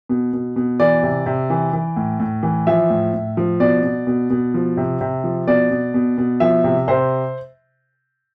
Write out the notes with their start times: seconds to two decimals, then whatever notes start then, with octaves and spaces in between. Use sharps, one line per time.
0.09 B2
0.33 B2
0.56 B2
0.80 E3 D5
1.03 C3
1.26 C3
1.50 E3
1.73 E3
1.96 A2
2.20 A2
2.43 E3
2.67 F3 E5
2.90 A2
3.13 A2
3.37 F3
3.60 B2 D5
3.83 B2
4.07 B2
4.30 B2
4.54 F3
4.77 C3
5.01 C3
5.24 F3
5.47 B2 D5
5.71 B2
5.94 B2
6.18 B2
6.40 F3 E5
6.64 C3
6.88 C3 C5